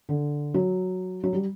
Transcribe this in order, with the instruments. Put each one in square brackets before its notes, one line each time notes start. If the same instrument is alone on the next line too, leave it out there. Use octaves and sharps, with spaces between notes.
[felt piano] D3
F#3
F#3
G3